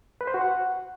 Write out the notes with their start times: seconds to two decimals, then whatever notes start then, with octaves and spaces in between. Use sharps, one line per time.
0.21 B4
0.27 C5
0.34 F#4
0.41 F#5